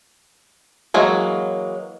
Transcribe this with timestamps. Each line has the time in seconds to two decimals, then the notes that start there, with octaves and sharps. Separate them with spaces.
0.94 E3 F#3 G#3 A#3